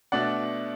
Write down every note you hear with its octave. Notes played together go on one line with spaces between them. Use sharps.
B2 A3 D4 D5 F#5